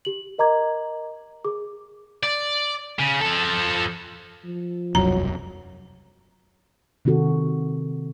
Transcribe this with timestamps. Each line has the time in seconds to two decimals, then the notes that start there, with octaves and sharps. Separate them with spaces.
0.05 G4 F#7
0.38 A#4 D#5 A#5 D6 G#6
1.45 G#4 D6
2.23 D5
2.99 C#3
3.21 F3 A4
4.45 F3
4.95 E1 C2 F#2 F#3 A#5
7.05 C3 D#3 C4 F#4 A4